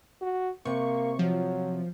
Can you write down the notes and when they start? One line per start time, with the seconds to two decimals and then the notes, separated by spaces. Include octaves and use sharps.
0.21 F#4
0.65 C3 A#3 C#6
1.19 F3 F#3